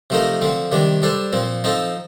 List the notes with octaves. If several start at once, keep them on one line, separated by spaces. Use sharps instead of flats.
C3 F3 A3 D#4 A#4
D3 F3 C4
C3 D#3 G3 D4
G3 D4 A4 C5
A#2 F3 C4
F3 C4 D#4 A4